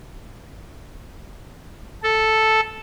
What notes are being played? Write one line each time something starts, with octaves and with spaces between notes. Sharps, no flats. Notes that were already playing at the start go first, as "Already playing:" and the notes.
A4